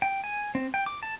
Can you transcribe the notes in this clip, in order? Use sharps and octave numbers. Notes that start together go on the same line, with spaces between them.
G5
G#5
C4
G5
D6
A5